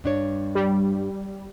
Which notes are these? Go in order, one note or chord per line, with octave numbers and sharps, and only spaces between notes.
G2 D4 C#5
G3